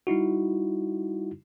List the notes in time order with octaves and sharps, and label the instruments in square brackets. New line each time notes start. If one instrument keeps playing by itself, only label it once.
[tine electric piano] G3 D#4 E4 F#4